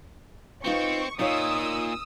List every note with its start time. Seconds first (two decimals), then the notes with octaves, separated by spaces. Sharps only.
0.64 C4 D#4 F4 B4 C#6
1.19 A#2 D#4 F4 C#5 D#6 E6